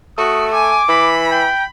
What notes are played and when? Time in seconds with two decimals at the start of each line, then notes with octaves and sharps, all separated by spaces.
0.18 A3 F#4 D#6
0.53 G#5 D6
0.88 E3 B5
1.31 G5